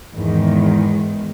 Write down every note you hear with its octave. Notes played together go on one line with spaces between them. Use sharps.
E2 G#2 D#3